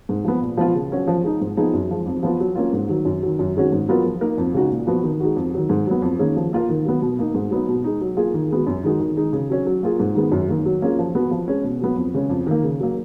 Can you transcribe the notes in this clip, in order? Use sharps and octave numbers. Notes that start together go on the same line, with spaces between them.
G#2
F3 B3
A#2
F3 B3 F4
C#3
F#3 C#4 F#4
F3
G#3 D#4
G#2
F3 B3 D#4 G#4
F#2
F3 G#3
F2
F3 B3 F4
F#3
A#3 C#4 F4
G#2
D#3 F#3
F#2
D#3 F#3
F#2
D#3 G#3 C#4 F#4
G#2
F#3 B3 F4 A#4
F3
A#3 D#4 A#4
F2
C#3 G#3 D#4 F#4
A#2
F3 B3 F#4
D#3
G#3 D#4 F#4
F2
D#3 F#3
G#2
F#3 B3
F2
D#3 A#3 C#4 G#4
F3
A#3 F4 A#4
D#3
F#3 B3
B2
A#3 D#4
G#2
F#3 B3 D#4
B2
G#3 D#4
F#3
A#3 F4 G#4
D#3
G#3 B3 F#4
F#2
D#3 G#3 D#4 F#4
D#3
G#3 D#4
C#3
F#3 C#4
F#3
A#3 F4 G#4
G#2
D#3 G#3 B3
F#2
D#3 A#3
F#3
A#3 C#4 F4 G#4
F3
B3 F#4
F3
G#3 C#4
B2
F#3 B3
F2
C#3 G#3 C#4
F2
D#3 A#3
C#3
F#3 A#3